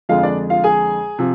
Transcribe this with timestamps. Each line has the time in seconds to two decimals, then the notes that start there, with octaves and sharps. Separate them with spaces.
0.09 F2 D3 G#3 F4 F5
0.23 D4 D5
0.50 F4 F5
0.64 G#4 G#5
1.19 C3 F3